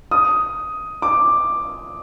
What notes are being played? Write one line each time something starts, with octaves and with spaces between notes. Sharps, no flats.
D#6
D6